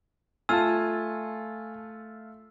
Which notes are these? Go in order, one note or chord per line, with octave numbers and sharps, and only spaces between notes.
A3 F4 G#5 A5 E6